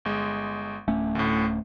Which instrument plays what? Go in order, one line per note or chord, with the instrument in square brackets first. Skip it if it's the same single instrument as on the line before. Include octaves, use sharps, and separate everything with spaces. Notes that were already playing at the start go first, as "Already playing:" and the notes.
[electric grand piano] G1 G#3
[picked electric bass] D1 A3 C#4
[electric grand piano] D2 A2